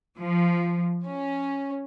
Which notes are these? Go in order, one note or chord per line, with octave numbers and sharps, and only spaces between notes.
F3
C#4